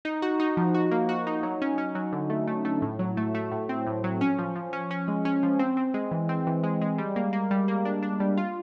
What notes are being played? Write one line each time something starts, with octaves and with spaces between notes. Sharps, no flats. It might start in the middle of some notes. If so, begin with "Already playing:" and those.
D#4
F#4
D#4
F3
F#4
A#3
F#4
D#4
F#3
C#4
C#4
F#3
D3
A3
A3
A3
A2
F#3
A3
A3
A2
C4
A2
F#3
C#4
F3
F3
C#4
C#4
G#3
C#4
F3
C4
C4
G#3
E3
C4
E3
G#3
G#3
G3
A#3
A#3
G3
A#3
D4
D4
G3
F4